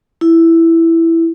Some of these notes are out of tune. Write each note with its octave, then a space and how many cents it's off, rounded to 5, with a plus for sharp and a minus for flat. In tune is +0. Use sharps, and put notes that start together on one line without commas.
E4 +5